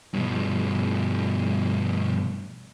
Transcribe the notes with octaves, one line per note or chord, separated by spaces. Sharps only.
G2 B2